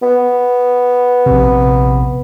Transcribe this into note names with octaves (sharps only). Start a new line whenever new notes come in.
B3
A#1 C3